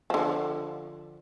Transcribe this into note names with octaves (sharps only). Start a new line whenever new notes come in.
D3 F3